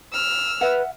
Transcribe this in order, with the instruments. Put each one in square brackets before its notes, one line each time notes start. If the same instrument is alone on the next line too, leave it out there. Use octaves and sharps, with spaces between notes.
[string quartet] E6 F6
[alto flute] B4 [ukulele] E5 F#5